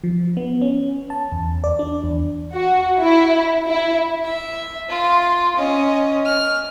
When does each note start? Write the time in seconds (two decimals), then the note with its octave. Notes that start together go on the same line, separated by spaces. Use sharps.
0.04 F3
0.37 B3
0.62 C#4
1.10 A5
1.32 E2
1.64 D5
1.79 D4
2.04 E2
2.54 F#4
3.01 E4
3.65 E4
4.25 E5
4.89 F4 C6
5.56 C#4 D#5
6.26 F6